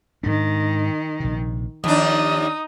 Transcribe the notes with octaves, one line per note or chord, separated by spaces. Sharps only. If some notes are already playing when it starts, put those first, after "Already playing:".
G#2 D#3 D4
A#1 C3
D#2 F3 D4 D#4 D#6